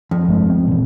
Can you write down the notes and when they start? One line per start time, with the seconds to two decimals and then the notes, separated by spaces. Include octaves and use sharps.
0.11 F2
0.28 G2 G#3
0.50 C4
0.68 A#2 E3